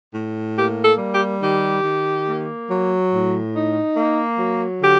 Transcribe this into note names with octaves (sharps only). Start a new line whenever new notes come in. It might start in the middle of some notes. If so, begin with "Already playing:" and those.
A2
A#3 G4
A4
G3
G4
D#3 G4
D#3
A#3
F#3
A2
D#4
A#3
F#3
D3 G4